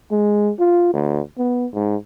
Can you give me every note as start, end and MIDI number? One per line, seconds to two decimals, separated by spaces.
0.11 0.52 56
0.59 0.93 65
0.93 1.20 38
1.38 1.66 59
1.74 1.96 44